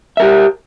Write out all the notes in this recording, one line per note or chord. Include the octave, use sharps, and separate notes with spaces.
G4 A#4 E5